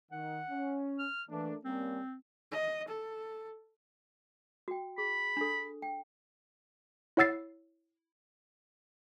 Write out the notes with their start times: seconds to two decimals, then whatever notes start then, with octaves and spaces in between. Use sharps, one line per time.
0.12 D#3 F#5
0.50 C#4
0.99 F6
1.29 E3 A3 A#3 D4
1.64 G3 A#3 C4 C#4
2.52 D#5
2.88 A4
4.68 F#4 G5
4.98 G#4 B5
5.37 D4 A4
5.82 G5
7.17 E4 C#5 F#5 E6 A6 C7